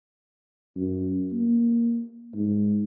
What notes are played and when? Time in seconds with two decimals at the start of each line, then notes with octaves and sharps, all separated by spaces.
0.76 F#2
1.32 A#3
2.35 G#2